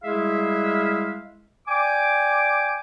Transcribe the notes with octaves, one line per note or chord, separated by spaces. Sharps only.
G3 G#3 E4 G#4 E5 F5
D5 G5 G#5 D6